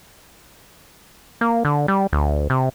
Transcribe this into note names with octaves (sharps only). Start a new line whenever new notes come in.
A#3
D3
G3
D2
C3